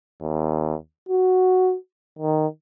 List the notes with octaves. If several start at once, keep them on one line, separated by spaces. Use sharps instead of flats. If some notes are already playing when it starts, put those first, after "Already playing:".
D#2
F#4
D#3